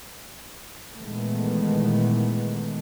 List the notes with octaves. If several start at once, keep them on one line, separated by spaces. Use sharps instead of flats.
A#2 D#3 E3 G#3 A3 B3